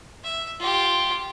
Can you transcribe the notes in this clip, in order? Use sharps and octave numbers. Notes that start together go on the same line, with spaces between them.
E5
F4 G4